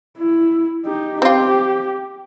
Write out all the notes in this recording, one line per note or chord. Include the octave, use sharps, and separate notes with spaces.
E4
D#4 G4
C4 F4 G4